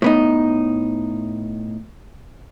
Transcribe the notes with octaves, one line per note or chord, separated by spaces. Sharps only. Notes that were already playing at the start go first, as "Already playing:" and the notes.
A2 B3 D#4